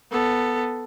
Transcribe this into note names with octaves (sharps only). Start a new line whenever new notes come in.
B3 A4